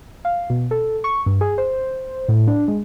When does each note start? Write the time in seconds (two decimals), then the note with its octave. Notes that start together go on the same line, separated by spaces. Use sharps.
0.25 F5
0.50 B2
0.71 A4
1.04 C#6
1.26 G2
1.41 G#4
1.58 C5
2.29 A2
2.47 D4
2.68 G#3